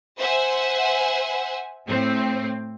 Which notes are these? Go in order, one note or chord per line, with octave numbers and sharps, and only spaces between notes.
C5 E5 F#5 G#5
A2 C4